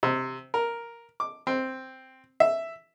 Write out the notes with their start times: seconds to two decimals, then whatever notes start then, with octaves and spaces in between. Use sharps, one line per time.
0.03 C3
0.54 A#4
1.20 D6
1.47 C4
2.40 E5